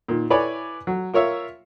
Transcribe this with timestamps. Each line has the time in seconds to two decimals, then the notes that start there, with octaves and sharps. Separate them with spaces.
0.08 A#2 D#3
0.30 E4 B4 C#5 D5 G#5
0.87 F#3
1.14 F4 A#4 C#5 E5 F5